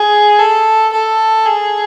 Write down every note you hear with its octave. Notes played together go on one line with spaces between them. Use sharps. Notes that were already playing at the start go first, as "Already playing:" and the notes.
Already playing: G#4
A4
A4
G#4